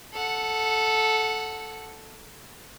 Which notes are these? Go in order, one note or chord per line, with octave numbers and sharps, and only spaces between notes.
A4 F#5